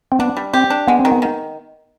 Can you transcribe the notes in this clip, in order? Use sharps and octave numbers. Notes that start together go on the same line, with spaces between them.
C4
B3 D4
G3
C4 G4
D4
G#3 B3
C4
D#3
B3
D#3